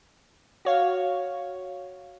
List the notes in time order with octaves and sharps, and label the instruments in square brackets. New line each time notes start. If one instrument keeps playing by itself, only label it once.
[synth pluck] F#4 C#5 F5